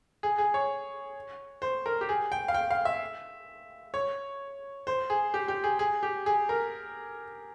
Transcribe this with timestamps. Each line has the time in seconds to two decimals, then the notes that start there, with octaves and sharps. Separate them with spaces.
0.23 G#4
0.38 G#4
0.54 C#5
1.62 C5
1.86 A#4
2.01 G4
2.09 G#4
2.32 G5
2.48 F5
2.54 G5
2.71 F5
2.85 E5
3.94 C#5
4.87 C5
5.10 G#4
5.34 G4
5.48 G4
5.64 G#4
5.79 G#4
6.03 G4
6.26 G#4
6.49 A#4